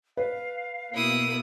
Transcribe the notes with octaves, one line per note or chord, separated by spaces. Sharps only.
B4 F5
B2 A#3 B3 E4 D#6